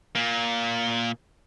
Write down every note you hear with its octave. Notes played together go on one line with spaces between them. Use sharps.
A#2 A#3